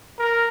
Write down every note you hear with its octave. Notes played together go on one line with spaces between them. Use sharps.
A#4